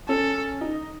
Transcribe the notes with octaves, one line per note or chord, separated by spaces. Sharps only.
C#4 A4
D#4